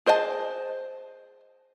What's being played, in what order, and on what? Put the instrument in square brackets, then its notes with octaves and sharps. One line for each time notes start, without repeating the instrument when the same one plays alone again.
[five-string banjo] G#4 C5 D#5 E5 A5